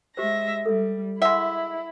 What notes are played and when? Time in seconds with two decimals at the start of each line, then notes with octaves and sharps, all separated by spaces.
0.17 G#3 G4 C5 E5 A#6
0.66 G3 A4 E5
1.22 G#3 E4 E5 F#5